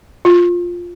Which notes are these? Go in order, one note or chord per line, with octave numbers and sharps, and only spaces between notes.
F4